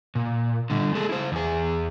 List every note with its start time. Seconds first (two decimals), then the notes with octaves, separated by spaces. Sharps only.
0.15 A#2
0.70 D3 G3
0.95 G#3 G#4 A4
1.09 E4 C5
1.32 E2 G#4